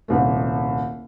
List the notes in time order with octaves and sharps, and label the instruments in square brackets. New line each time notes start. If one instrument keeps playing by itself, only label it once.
[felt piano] D#1 C2 A3